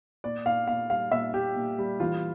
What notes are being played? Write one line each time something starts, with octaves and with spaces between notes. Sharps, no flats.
A#2 D5
A#2 F5
A#2 F5
G3 F5
A#2 E5
A#2 G4
A#2
G3
E3 F4